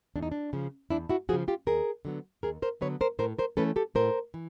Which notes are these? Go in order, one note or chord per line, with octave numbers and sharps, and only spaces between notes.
E2 D4
D#4
D4
C#3 F3
E2 D4 E4
E4 F#4
C#3 F3 F#4 G#4
F4 G4
D#2 G#4 A#4
D3 F#3 B3
D#2 G#4 A#4
A#4 C5
D3 F#3 B3 B4 C#5
A#4 C5
A2 A#4 C5
A#4 C5
E3 A3 C#4 A4 B4
G4 A4
A2 A#4 C5
E3